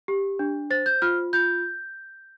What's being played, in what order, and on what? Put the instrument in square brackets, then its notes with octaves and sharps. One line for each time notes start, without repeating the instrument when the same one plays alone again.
[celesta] G4
D4
C5 A6
G6
F4 F6
F4 G6